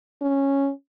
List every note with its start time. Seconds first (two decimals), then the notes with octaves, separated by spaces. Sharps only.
0.21 C#4